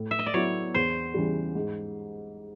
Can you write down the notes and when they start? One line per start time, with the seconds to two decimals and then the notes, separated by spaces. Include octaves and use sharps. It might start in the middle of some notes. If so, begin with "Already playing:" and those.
Already playing: A2
0.11 E5
0.19 D#5
0.26 D5
0.34 F#3 B3 E4 C#5
0.74 E2 C5
1.14 C#3 E3 G3
1.55 G#2